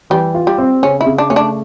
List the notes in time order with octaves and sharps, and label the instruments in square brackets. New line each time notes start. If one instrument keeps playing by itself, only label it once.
[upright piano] E3 [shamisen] G3
[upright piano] F4
[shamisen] G3
[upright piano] C4
[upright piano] C#3 [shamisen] C#4
[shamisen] E4
[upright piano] C#3
[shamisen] D4
[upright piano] A3 [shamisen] C#4
[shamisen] D4